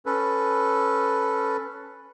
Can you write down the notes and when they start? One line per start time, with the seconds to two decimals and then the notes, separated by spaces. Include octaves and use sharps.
0.06 C#4 A4 B4